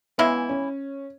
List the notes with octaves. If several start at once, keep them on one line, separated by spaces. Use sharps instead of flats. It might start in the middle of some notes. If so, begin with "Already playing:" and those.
C#3 E3 G#3 B3 E4
C#4